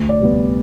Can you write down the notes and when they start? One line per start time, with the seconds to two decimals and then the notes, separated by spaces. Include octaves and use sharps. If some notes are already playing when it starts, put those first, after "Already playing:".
Already playing: D2
0.09 D5
0.20 C3 G3 B3